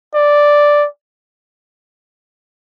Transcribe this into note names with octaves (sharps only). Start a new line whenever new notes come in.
D5